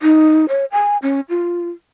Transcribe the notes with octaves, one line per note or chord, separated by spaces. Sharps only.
D#4
C#5
G#5
C#4
F4